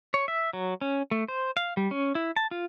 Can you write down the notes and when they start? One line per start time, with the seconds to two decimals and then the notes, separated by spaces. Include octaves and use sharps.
0.14 C#5
0.28 E5
0.53 F#3
0.81 C#4
1.11 A3
1.28 C5
1.57 F5
1.77 G3
1.91 C#4
2.15 E4
2.36 A5
2.51 F4